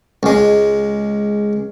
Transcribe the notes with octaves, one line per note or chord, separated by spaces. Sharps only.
C#2 G#3